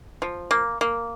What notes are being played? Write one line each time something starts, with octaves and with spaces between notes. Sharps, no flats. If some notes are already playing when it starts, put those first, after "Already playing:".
F3
A#3
A#3